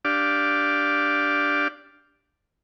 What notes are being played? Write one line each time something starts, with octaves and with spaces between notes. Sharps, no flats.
D4 G4 D5 F5